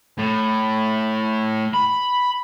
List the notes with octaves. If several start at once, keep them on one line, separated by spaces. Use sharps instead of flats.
A2
B5